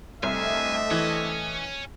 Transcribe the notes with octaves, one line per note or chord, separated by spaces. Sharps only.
C2 A3 C4 D4 D#5 E5 G#5
E3 C#5 G#5